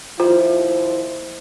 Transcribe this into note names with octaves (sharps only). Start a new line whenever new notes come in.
D#2 F3 E4 F4 C5